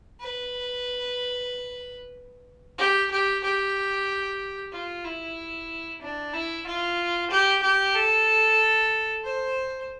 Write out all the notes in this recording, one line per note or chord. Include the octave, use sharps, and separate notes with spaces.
B4
G4
G4
G4
F4
E4
D4
E4
F4
G4
G4
A4
C5